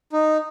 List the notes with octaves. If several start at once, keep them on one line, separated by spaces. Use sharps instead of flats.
D#4